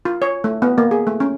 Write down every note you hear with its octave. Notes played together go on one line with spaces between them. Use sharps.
F4
C#5
A3
B3
A#3
G#4
A3
C#4